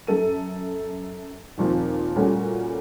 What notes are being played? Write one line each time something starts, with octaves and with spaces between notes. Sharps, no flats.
F#2 A4 D#7
D#2 A#2 F3 C4
A#2 G3 A3 C#4 F#4